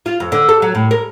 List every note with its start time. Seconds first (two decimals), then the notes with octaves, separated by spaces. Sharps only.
0.06 F4
0.20 F2
0.32 D3
0.49 A4
0.62 F#3
0.75 A2
0.91 A#4